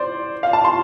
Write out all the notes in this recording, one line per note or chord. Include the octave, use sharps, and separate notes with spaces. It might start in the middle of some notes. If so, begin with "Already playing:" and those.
Already playing: C5 D5
F5
A5
C6